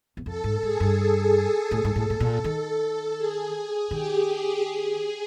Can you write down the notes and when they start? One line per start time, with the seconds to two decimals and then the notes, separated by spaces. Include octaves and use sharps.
0.17 E2
0.26 F2 A4
0.44 G#2
0.63 G#2 G#4
0.80 G2
1.35 G#4
1.71 A2 A4
1.85 G#2
1.96 A2
2.08 A2 A4
2.20 A#2
2.44 D#3 A4
2.81 A4
3.18 G#4
3.91 D#3 G4
4.27 G#4
4.63 G#4